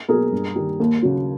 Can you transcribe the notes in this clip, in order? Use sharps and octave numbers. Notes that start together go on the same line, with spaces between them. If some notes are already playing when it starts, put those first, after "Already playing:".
B2 F#3 G#4 A#4
G2
D#3 G3
D#2
C#3 F#3